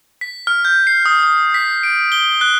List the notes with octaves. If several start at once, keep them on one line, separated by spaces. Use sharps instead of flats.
B6
F6
G6
C7
D#6
D#6
B6
D7
G7
F#6